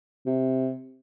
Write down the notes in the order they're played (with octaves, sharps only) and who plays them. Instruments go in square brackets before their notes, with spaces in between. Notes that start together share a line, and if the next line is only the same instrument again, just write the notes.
[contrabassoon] C3